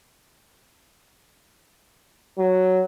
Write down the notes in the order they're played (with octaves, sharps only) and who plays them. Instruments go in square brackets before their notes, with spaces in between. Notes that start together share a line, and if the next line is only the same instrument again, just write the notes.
[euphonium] F#3